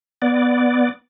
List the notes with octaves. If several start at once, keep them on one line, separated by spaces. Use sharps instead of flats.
B3 D5